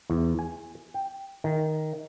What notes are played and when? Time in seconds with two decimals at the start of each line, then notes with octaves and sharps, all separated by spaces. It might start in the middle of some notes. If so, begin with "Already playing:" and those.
0.10 E2
0.39 G#5
0.94 G5
1.44 D#3